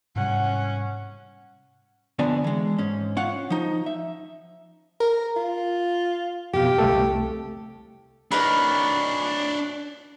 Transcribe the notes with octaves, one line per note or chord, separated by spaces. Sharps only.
G#2 C3 G3 C#4 F#5
F2 D3 B3 D5 G#5 A#5
E3 G#3
G#2 C#4
C#4 F4 F5 F#5
F3 D#4
E5
A#4
F4
F2 B2 G4 F5
C2 A3 A4
D4 D#4 A#4 B4 C#5 B5